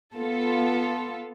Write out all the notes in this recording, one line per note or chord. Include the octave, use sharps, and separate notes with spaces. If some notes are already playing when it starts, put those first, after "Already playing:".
B3 F4 A4